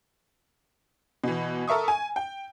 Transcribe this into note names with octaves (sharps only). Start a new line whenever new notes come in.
B2 E3
A4 A#4 E5 C#6 D#6
G#5
G5